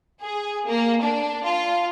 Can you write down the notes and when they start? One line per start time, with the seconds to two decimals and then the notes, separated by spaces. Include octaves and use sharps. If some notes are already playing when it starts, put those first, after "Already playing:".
0.21 G#4
0.68 A#3
1.02 D4
1.44 F4